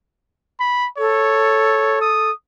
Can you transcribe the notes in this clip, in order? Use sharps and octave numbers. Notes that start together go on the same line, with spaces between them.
B5
A4 C#5
D#6